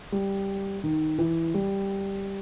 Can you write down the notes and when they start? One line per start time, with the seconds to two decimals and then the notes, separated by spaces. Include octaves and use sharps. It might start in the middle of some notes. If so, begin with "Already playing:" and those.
0.12 G3
0.84 D#3
1.18 E3
1.54 G3